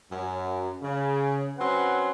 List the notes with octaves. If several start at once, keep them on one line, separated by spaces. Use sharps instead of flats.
F#2
C#3
F#3 C4 C#4 B4 F#5 C6